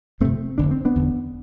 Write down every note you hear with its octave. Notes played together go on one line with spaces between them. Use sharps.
G1 F2 C3 A3 C4
F1 E2 D3 D4
C4
B3 D4
F1 E2 D3